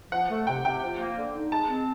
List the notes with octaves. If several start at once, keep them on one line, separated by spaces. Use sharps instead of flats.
F3 F#5
A3
C3 G5
C3 G5
F3
A#3
D3
D#4
G#3 A5
C4